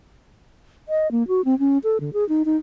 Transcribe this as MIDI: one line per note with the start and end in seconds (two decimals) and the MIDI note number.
0.89 1.10 75
1.11 1.26 58
1.28 1.45 66
1.45 1.58 60
1.59 1.78 61
1.84 1.98 69
2.00 2.10 50
2.13 2.27 68
2.29 2.43 63
2.45 2.57 63